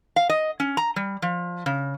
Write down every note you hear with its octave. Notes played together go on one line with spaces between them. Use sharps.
F5
D#5
C#4
A#5
G3
F3
C#3